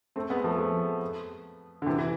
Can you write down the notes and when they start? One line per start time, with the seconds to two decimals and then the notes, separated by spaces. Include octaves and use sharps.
0.16 A3 C4
0.30 G#3 B3
0.44 F3 A3
0.58 F3 A3
1.82 D3
1.86 C3 E3
1.98 E3